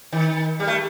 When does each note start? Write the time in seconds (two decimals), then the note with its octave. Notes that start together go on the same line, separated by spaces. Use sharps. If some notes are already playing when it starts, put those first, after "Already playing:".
0.12 D#3
0.60 G3
0.67 A3